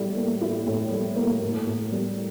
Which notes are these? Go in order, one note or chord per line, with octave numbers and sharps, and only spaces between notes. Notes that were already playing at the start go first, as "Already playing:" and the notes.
Already playing: A2 G3
A#3
E4
A2
G3
A#3
A2
A2
G3